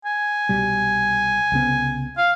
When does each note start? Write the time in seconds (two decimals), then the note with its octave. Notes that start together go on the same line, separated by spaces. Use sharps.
0.05 G#5
0.49 C2 B2 G3
1.52 C2 C#3 B3
2.17 F5